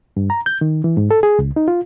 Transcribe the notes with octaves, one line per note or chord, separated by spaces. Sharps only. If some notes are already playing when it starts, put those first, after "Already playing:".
G2
A#5
G6
D#3
E3
G#2
A4
G#4
C#2
D#4
F4